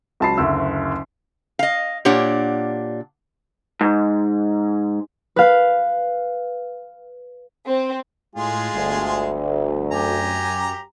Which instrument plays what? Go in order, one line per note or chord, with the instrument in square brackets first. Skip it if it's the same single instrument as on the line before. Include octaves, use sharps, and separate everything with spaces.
[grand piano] C#2 F#3 A5 B5 C7
F#1 D2 E6
[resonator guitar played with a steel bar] D#5 F5
A#2 D4 G4 C#5 F#5
[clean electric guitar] G#2
[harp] B4 F5
[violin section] C4
[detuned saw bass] A2 [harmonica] G#3 F4 G#4
[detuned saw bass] G1 [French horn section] D2
[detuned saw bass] F#2 [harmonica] G4 G#5 A#5